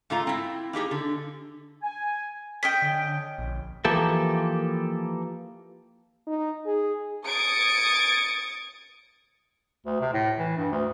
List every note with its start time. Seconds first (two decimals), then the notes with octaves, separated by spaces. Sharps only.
0.10 G#2 A3 F4 A#5
0.27 C4 E4
0.73 A#3 D#4 G4 G#4
0.91 D3
1.82 G#5
2.63 C#4 D#5 G5 B6
2.82 D3
3.38 A#1
3.85 E3 F3 A#3 G4 A4
6.27 D#4
6.66 G#4
7.26 D#6 G#6 A6 C#7 D7
9.86 D2
10.00 C3
10.13 A2
10.39 E3
10.57 G2
10.72 D2